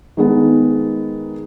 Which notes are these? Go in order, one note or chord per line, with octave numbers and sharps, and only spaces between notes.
D#3 G#3 B3